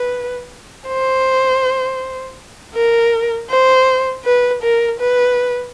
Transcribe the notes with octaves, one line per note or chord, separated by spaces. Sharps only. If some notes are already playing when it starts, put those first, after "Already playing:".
Already playing: B4
C5
A#4
C5
B4
A#4
B4